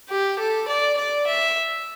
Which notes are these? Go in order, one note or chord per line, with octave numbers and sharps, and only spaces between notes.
G4
A4
D5
D5
E5